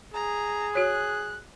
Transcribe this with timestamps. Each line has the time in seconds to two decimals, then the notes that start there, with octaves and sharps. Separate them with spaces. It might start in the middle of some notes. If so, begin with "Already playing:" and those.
0.14 G#4 A#5
0.75 F#4 C#5 F#6